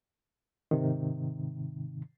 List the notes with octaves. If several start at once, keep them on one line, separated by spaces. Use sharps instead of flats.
G#2 C3 D#3